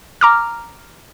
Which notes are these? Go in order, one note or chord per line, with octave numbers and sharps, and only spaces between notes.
A#5 D6 F6